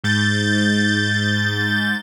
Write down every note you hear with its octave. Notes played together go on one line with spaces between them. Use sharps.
G#2 G6 A6